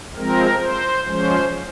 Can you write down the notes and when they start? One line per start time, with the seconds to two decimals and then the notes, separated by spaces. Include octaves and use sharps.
0.16 F3 G#3 C4 A#4
0.60 C5
1.04 F3 G#3 C#4 C5